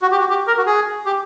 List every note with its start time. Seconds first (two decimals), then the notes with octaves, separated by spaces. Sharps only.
0.02 F#4
0.12 G4
0.20 F#4
0.30 G4
0.47 A#4
0.57 F#4
0.66 G#4
1.06 G4